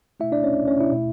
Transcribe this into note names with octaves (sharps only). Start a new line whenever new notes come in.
B2 A3 E4 E5
D4 D5
C#4 C#5
C#4 C#5
E4 E5
B2 A3